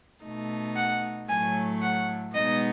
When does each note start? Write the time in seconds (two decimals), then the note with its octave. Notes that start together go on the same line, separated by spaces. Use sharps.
0.24 B2 A3 D#4
0.76 F#5
1.29 A2 F#3 A3 G#5
1.82 F#5
2.33 B2 G#3 B3 D#4 D#5